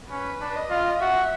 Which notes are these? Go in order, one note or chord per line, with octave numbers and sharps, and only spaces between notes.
C#4 B4
D4
D#5
F4
F#4 E5